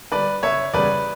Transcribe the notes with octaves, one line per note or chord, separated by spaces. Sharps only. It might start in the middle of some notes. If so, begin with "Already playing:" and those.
D3 G3 B4 D5
F#1 C#5 E5
E2 C#3 G3 B4 D5